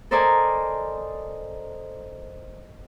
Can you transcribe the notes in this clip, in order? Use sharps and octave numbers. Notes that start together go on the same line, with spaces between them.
A4 A#4 C5 D5 D#5 G#5